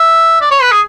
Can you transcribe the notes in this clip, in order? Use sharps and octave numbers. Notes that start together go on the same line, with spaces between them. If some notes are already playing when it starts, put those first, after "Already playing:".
Already playing: E5
D5
C#5
B4
G#4